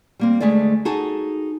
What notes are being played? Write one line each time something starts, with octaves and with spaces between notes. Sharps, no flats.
G3 A#3 C4
D2 G#3 A3 G#4 D5
D#4 F#4 G#4 A4 A5